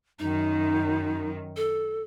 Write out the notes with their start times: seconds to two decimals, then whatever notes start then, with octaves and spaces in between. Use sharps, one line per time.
0.19 F#2 D#3 D#4
1.56 A4